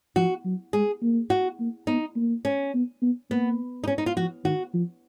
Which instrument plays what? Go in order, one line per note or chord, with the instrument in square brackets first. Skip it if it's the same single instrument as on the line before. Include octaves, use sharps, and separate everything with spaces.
[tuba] F3 [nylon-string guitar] F#4
[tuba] F#3
[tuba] G#3 [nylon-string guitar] G#4
[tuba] A#3
[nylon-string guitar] F#4
[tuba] A#3
[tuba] B3 [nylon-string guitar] D#4
[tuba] A#3
[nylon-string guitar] C#4
[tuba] B3
B3
[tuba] A#3 [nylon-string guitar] B3
[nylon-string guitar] D#4
C#4
D#4
F4
[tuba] F3 [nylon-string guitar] F#4
[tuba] D#3 [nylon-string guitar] F#4
[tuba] F3